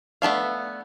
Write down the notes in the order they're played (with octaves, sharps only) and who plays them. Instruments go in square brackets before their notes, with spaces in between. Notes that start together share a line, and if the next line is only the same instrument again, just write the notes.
[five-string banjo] A3 B3 D4 F5